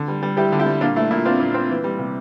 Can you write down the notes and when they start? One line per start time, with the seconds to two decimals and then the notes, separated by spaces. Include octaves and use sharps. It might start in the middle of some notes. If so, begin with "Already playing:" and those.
Already playing: D3
0.08 G3
0.23 G3
0.37 G3 E4 G4
0.52 D3
0.59 E4 G4
0.66 G3
0.81 A#2 D4 F4
0.96 A3 E4
1.11 A#2 E4
1.25 C4 D4 F4
1.40 A#2
1.54 C4
1.70 E3
1.84 G3
1.99 C3